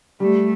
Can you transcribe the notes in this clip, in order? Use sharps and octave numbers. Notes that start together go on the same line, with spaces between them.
G3 A3